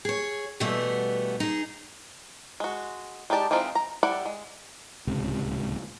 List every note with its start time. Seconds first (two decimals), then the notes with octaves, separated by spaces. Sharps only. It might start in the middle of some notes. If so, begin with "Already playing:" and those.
0.05 G#4 C#5
0.60 B2 E3 G3 A3 B3
1.40 D#4 G#4
2.60 G#3 F#4
3.30 G#3 D#4 G4 D5 A5
3.51 E3 G#3 C4 D#4 F4
3.75 A#5
4.03 G3 E4 D5 F#5
4.26 G#3
5.07 D1 C#2 C3